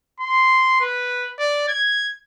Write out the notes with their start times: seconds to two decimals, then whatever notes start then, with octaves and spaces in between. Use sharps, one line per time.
0.20 C6
0.81 B4
1.39 D5
1.68 G#6